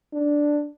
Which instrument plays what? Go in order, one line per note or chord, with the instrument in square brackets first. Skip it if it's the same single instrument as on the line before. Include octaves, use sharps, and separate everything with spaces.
[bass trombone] D4